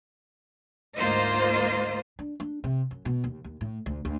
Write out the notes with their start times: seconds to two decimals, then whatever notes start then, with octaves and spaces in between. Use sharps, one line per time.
0.98 D2 G#2 A#3 F4 C5 D#5
2.19 D4
2.40 D4
2.64 C3
2.91 F#2
3.05 B2
3.24 D#2
3.44 D#2
3.61 A2
3.86 D2
4.05 D2